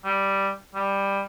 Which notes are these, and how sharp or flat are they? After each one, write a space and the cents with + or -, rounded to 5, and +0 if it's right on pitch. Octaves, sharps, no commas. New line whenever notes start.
G3 +0
G3 +10